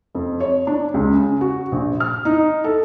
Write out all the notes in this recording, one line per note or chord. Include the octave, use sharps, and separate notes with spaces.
F2
C#5
D4
C#2
C#3
F#4
A#1
F6
D#4
A4